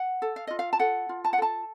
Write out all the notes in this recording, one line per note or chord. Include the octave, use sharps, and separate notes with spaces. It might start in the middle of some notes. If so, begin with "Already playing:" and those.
Already playing: F#5
A4
F5
F4 D#5
F5
A5
A4 F#5
F4
A5
F#5
A4 A5